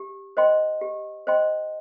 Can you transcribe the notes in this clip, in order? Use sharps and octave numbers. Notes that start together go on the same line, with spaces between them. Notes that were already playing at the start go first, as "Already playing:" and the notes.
Already playing: G4
C5 D#5 G5 C6
G4
C5 D#5 G5 C6